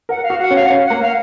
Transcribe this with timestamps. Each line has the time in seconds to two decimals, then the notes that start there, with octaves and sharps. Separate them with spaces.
0.09 A#4 F#5
0.24 F5
0.30 F#4
0.40 F#5
0.51 C#4
0.56 F5
0.70 C#4
0.86 A#3 F#5
1.02 F5